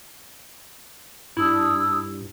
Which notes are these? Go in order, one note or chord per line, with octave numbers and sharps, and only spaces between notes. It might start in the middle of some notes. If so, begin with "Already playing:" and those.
G2 D4 E4 D#6 E6